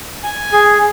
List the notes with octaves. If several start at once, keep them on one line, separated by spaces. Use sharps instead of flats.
G#5
G#4